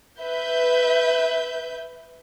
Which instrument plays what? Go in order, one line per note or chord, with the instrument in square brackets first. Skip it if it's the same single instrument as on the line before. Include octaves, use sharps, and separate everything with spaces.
[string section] B4 E5 G6